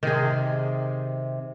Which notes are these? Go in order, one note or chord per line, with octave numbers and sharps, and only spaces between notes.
C3 D#3 G#4